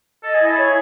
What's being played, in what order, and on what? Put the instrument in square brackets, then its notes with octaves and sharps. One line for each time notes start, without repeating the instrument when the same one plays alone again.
[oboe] A4 [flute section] D#5
[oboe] G#4
[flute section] E4
[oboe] A4
[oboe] G#4 [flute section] C#5